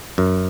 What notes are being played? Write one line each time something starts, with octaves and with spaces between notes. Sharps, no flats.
F#2